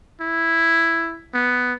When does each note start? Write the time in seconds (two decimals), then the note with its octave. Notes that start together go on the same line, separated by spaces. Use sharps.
0.21 E4
1.34 B3